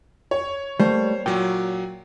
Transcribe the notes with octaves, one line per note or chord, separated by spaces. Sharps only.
C#5
G3 A3 A#3 C5
A#2 F#3 G5